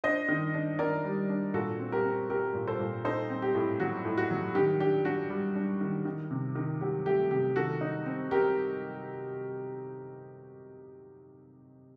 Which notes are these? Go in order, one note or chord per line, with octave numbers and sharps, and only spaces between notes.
D4 C5 D#5
D#3
D4
D#3 A#4 D5
G3
D4
A#2 F#4 A4
C4
G4 A#4
C4
C4 G4 A#4
A#2
A4 C5
A#2
D#4 A4 C5
C4
G4
A2
F#3 F#4
A2
F#4
F#3
D#3 G4
D4 G4
D4 F#4
G3
D4
D#3
D#3
C3
D#3
F#3 G4
A3 G4
C3 G4
D#3 F#4 A4
D#4
C4
C4 G4 A#4